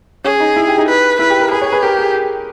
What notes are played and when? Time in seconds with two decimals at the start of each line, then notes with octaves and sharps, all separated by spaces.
0.25 C#4 G#4
0.40 D#4
0.56 E4
0.68 G4
0.78 D#4
0.88 B4
1.19 E4 B4
1.30 G4
1.40 A#4
1.51 G#4 B4
1.62 C#5
1.72 B4
1.83 G4 A#4
1.99 G#4